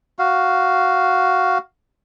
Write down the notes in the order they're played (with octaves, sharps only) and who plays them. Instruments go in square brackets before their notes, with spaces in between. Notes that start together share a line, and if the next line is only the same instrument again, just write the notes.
[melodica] F#4 F5